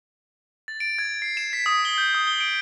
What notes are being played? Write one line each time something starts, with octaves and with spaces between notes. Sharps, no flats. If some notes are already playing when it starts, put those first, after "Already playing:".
A6
D7
G#6
C7
E7
B6
D#6
G7
G6
D#6
G7
D7